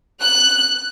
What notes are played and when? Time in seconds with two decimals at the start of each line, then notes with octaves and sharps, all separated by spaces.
0.21 F#6